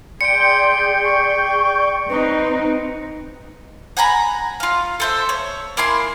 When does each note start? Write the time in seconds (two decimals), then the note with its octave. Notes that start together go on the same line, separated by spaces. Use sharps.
0.21 G#4 D5 G5 C6 G6 C#7 D7
1.04 C#6
2.09 C4 D#4 B4
3.97 F#5 G#5 A#5 B5
4.60 F4 F5
5.00 A4 C5 E5
5.29 C#5
5.77 A#3 E4 G#5 C6